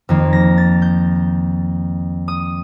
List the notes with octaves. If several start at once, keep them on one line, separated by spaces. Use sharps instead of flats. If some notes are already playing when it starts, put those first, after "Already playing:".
F2 D#3 A#3
A#6
A6
G6
D#6